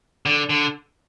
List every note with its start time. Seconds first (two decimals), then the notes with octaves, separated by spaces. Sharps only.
0.26 D3
0.49 D3